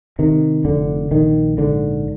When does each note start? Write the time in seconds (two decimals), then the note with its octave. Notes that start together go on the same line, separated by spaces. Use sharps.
0.19 C3 D#3
0.65 F1 D3
1.11 A#1 D#3
1.58 G#2 D3